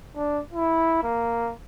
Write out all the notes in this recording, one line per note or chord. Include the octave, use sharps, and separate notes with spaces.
D4
E4
A#3